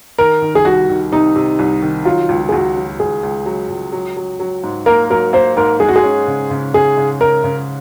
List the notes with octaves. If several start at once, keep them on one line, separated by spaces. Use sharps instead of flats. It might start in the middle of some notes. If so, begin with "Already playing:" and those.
D#3 A#4
D#3
G#4
C2 F#4
D#3
C3 D#4
C3
C2
D#3
F#3 F4
C#2
G#4
C#2 F#4
F#3
C#2 G#4
C#2
F#3
C#2
F#3
F#3
F#3
G#2
A#3 A#4
F#3 A#4
A#3 C5
G#2 A#4
G#3 G#4
F#4
G#4
C#4
C#3
C#3
C#3 G#4
C#3
C#3 A#4
C#3